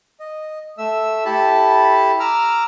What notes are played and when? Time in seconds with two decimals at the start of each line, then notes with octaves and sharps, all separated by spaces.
0.20 D#5
0.78 A3 E5 E6
1.25 E4 G4 A4 A5 B5
2.20 A#5 D6 E6 F6